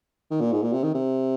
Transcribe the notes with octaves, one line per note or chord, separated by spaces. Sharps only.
D#3
A#2
G#2
A#2
C3
D#3
C3